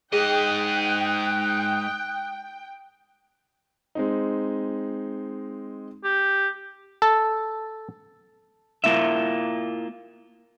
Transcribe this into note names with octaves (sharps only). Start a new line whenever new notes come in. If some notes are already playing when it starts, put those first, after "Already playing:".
G#2 G#4 D#5 G5 D#6 F#6
G#3 C4 D#4
G4
A4
A#3 E4 F4 E5